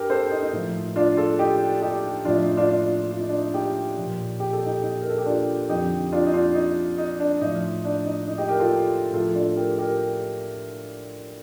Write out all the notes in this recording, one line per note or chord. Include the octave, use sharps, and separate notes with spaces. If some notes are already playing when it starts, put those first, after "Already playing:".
Already playing: G2 D3 G4 A#4
A4 C5
D#4
D#4
A2 F3 D#4
D4 F4
F4 A4
D#4 G4
D#4 G4
A2 F3 D4 F4
D#4
D#4
D4 F4
D4 F4
F4
D#4
D4
D#4
D#4 G4
A#2 F3
G4
A4
D#4 G4
D#4
A#4
A4
G4
D4 F4
F2 D3 F3 D#4 G4
D4 F4
D#4
D4 F4
D#4
D#4
D4
A2 F3 D#4
D4
D#4
D#4
D#4 G4
G4 A#4
F4 A4
A2 F3 F4 A4
D4 F4
G4 A#4
G4 A#4